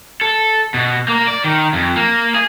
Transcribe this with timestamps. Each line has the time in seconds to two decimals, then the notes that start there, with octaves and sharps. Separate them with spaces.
0.21 A4
0.74 B2
1.08 A#3
1.27 D5
1.44 D#3
1.73 F2
1.96 A#3
2.34 G#4